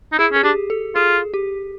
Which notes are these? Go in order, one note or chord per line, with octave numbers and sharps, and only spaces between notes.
D#4
E4 G#4
C#4 G#4
D4 G4
A4
F4 G#4
G4